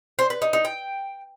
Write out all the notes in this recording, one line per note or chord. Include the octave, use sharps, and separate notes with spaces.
C5
B4
D#4
D#4
G5